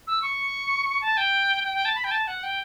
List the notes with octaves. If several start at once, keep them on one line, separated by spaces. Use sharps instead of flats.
E6
C#6
A5
G5
G5
G5
A5
B5
G5
A5
F#5
G5